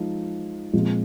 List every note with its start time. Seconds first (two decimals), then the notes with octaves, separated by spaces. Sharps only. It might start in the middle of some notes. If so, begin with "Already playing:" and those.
Already playing: F3 G#3 D#4
0.73 A#2 F3 G#3 C4 F4